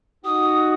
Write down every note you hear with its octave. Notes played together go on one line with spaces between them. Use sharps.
D#4 F#4 D#6